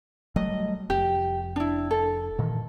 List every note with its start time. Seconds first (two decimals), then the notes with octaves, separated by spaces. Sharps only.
0.36 F#3 G3 A3 D#5
0.90 F1 G4
1.56 D4 E4
1.91 A4
2.39 A#2 D#3 E3